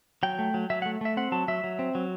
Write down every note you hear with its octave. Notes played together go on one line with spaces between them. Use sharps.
F#3 G5
A3
F#3
F#3 E5
F#5
A3
A3 E5
C4 F#5
F#3 A5
F#3 E5
F#3
C4
F#3